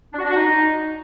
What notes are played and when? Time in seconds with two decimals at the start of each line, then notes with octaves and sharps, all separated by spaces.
0.13 D4
0.19 F#4
0.24 D4
0.30 F#4
0.35 D#4